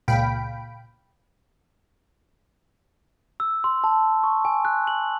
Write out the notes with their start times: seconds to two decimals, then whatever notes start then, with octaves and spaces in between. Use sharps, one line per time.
0.08 C#2 A#2 F5 G5 B5 D7
3.40 E6
3.64 C6
3.84 A5
4.23 C#6
4.45 G#5
4.65 F#6
4.87 F#7